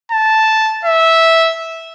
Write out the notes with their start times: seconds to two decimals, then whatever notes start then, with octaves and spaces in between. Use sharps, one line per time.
0.12 A5
0.85 E5